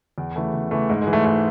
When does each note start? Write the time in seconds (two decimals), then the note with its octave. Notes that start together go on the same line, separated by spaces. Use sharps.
0.18 E2
0.36 C#3 E3 A3
0.54 E2
0.71 C#3 E3 A3
0.89 G#2 G#3
1.02 G#3
1.07 E3
1.13 A3
1.25 G#2 A3